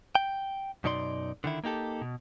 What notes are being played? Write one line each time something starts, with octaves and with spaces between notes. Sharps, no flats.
G5
F#2 B2 D#4 D5 C6
D3 D#3 E4
A#3 D#4 G4 A4
B2